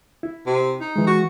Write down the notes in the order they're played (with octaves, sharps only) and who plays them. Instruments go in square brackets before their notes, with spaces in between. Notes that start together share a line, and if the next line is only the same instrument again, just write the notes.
[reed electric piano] E4
[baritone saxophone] C3
D#4
[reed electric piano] E3 G#3
[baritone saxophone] F#4